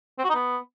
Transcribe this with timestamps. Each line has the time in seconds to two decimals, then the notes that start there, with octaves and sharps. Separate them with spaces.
0.19 C4
0.24 F#4
0.30 D#4
0.35 B3